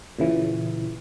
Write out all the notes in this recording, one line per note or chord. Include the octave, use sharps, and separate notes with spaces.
A#2 C#3 E3